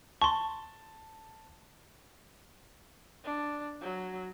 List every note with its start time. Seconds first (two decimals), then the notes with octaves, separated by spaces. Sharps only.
0.22 A5 C6 C#6
3.24 D4
3.81 F#3